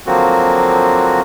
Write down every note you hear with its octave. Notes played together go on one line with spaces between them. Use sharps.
D3 F3 F#3 A#3 C4 F#4